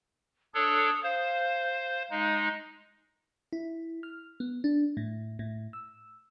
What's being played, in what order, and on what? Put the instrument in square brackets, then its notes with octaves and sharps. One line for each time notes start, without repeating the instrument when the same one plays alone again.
[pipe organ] D4 A4 C#5 [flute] D#6
[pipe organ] C5 [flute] F5
[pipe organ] G#3 D#4
[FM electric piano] E4
F6
B3
D4
A2
A2
E6